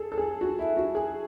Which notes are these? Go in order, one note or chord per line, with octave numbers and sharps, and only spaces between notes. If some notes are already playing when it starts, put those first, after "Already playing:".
Already playing: G#4 A4
A4
G#4
F#4
E4
F#4
G#4